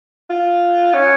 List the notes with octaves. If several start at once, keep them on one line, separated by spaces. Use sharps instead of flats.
F4
C#4